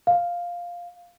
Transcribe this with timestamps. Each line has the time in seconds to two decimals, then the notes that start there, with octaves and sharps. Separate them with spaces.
0.07 F5